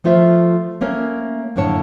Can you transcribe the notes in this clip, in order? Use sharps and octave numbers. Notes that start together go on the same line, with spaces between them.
F3 A3 F4 C5 E5
A3 A#3 C#4 A#4
F#2 A2 D3 A#3 C#5 A5